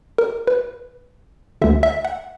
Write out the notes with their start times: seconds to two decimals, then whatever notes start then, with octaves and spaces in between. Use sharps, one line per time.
0.18 A#4
0.47 B4
1.62 D2 D3 E5
1.83 E5
2.05 F#5